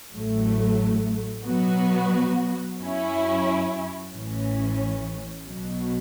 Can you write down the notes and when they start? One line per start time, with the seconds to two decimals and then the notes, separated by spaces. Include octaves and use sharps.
0.12 A1 A2 F#3 A3
1.45 B2 F#3 B3 F#4
2.78 F#2 F#3 C#4 E4
4.13 A1 A2 E3 C#4
5.45 B1 B2 F#3